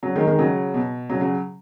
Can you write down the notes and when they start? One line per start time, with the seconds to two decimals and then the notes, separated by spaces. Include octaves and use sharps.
0.03 C#3 F#3
0.16 D#3 G#3
0.27 D#3 G#3
0.39 C#3 F#3
0.74 B2
1.09 C#3 F#3
1.21 C#3 F#3